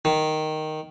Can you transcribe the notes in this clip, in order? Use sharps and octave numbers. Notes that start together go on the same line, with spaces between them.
D#3